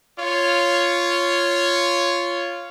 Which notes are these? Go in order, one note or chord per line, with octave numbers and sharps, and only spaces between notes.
F4 C#5